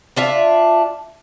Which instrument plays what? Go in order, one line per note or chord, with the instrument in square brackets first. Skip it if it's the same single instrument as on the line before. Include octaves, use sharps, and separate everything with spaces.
[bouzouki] D4 F4 E5